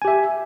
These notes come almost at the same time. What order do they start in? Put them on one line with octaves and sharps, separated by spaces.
G#5 G4 E5